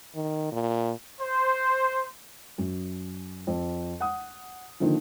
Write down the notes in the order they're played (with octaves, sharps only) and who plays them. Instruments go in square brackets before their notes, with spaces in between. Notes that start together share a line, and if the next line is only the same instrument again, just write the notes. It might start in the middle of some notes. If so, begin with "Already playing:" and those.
[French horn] D#3
A#2
[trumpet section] C5
[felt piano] F#2
F2
F#5 D#6
D3 D#3 F3 A#3 D#4